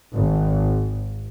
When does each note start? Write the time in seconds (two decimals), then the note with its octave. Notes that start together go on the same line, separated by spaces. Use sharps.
0.15 G#1